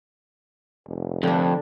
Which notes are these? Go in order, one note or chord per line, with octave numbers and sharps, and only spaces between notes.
F1
F2 D3 D4